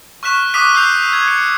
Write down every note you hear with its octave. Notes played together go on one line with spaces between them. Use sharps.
C#6 F6 F#6 B6 E7
D6 D#6 F6 F#6 B6 D#7
E6 F#6 G6 B6 C7 F7
G#6
C#7